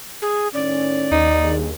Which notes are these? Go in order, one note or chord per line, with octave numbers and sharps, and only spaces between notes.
G#4
A2 D#3 C#4 D5
D#2 D#4
G2 D#3 G#4